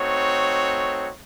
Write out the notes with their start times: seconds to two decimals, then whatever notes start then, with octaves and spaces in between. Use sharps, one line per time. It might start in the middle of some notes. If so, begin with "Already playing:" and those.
Already playing: A3 C4 D#4 F#4 C#5